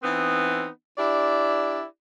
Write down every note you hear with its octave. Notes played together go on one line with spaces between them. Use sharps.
E3 B3 C4 D#4
D4 E4 G4 D5